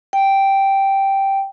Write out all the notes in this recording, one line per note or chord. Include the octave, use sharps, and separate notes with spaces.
G5